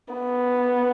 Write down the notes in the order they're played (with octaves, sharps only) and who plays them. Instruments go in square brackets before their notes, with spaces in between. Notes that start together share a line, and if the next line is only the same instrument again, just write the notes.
[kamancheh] B3